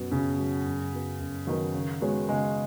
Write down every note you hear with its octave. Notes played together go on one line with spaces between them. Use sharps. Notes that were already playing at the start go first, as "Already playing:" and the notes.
Already playing: F#2 B2 F#3 B3
F#2 C#3
F#3 B3
F#2
F#3 B3
F#2
D#3 F#3 B3
C#3
G#3 B3 F#4 C#5
C#3 G#3